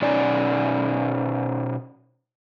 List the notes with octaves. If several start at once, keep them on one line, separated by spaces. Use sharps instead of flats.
B2 C#4 D#4 D5 G#5